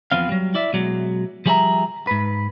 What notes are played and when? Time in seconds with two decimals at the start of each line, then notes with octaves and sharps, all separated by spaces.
0.12 E2 F3 B3 C4 F5
0.29 F#3 G3
0.54 E4 D5 E5
0.73 B2 F#3 G#3
1.46 F3 G3 G#4 C#5 E5 A#5
2.07 G#2 B4